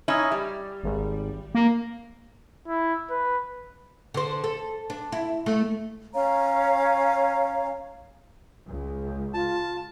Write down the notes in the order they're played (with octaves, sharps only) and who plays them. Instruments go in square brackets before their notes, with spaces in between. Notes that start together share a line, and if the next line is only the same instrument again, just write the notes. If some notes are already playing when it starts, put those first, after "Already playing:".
[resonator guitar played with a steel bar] C#4 D#4 E4
G3
[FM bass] G#1
A#3
[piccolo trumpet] E4
B4
[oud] D3 C5
A4
D4
E4
A3
[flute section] C#4 C#5 F5 A#5
[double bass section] C#2
[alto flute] F4 [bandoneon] A5